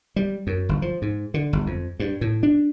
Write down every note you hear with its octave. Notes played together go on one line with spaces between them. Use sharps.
G3
F#2
G1
F3
G#2
D3
G1
F2
G2
A2
D4